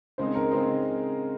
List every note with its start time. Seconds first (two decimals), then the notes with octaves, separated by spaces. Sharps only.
0.18 C#3 G#3 C4 D#4 C5
0.35 A#4
0.51 C#3 G#3 C4 D#4